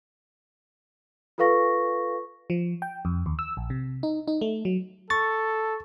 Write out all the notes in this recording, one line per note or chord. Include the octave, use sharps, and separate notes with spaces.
F4 A4 B4 F5 C#6 A#6
F3
G5
F2
D#2
E6
A#1
C3
D#4
D#4
A3
F#3
A4 C#6 A6